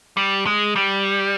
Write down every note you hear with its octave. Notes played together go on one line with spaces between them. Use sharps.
G3
G#3
G3